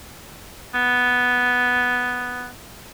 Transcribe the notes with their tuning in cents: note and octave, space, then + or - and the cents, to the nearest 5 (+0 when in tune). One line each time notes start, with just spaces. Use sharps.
B3 +0